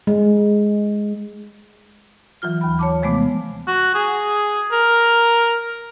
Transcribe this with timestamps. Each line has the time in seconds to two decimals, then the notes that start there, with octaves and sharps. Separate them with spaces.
0.07 G#3
2.42 E3 F#3 F4 F6
2.61 D#2 B5
2.79 C#5 A5 D6
3.02 C3 F3 G#3 A3 B3 D6
3.67 F#4
3.94 G#4
4.72 A#4